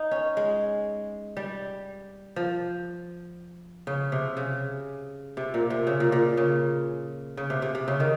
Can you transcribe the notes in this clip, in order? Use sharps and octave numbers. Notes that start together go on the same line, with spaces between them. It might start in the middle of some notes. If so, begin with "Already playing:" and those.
Already playing: D#4
C#4
G#3
G3
F3
C#3
C3
C#3
C3
A#2
C3
C#3
A#2
A#2
C#3
C#3
C3
C3
C3
C#3
D#3